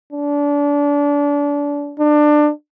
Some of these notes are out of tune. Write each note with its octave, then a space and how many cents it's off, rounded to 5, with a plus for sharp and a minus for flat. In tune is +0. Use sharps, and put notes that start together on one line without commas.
D4 -30
D4 +20